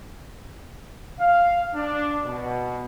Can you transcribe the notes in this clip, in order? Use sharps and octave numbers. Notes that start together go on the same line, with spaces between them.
F5
D4
B2